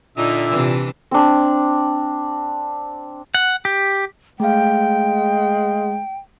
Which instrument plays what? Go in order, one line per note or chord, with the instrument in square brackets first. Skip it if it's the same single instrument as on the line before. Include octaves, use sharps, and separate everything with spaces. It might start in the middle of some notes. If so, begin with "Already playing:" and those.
[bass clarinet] A#2 [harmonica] D3 E5 [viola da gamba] D#4
[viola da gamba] C3 E3 D4
[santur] C4 D4
[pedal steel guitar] F#5
G4
[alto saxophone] G#3 [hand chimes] A3 F5 [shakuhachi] G5